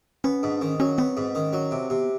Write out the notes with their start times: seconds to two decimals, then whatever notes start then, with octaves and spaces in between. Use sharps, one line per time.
0.24 B3 C#4
0.43 G#2 D4
0.60 D#3 C#4
0.80 F#3 C#4
0.98 B3 C4
1.17 G#2
1.35 D#3 C#4
1.53 F#3
1.71 C3 C4
1.90 C3 B3